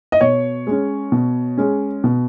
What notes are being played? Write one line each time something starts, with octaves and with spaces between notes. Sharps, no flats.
D#5
B2 C#5
G#3 C#4
B2
G#3 C#4
B2